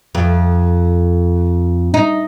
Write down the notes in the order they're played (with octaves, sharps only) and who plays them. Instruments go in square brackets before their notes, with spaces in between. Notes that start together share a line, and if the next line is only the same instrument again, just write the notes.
[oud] F2
D#4